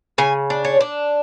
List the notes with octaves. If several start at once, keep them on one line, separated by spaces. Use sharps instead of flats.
C#3 G#5
D4
C#5
D4